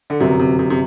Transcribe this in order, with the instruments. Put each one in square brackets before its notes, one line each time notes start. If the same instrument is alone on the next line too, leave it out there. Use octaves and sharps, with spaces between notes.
[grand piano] D3
[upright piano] G1 F#2 F#3 [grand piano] C3
[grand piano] C3
C3
C3